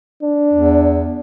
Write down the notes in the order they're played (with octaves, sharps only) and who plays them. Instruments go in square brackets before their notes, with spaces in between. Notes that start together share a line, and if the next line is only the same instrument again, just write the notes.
[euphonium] D4
[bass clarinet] E2